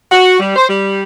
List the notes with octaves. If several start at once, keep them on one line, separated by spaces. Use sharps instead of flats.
F#4
G3
C5
G3